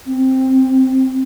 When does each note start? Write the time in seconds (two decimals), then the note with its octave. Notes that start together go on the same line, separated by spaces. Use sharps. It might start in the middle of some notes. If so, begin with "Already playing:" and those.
0.07 C4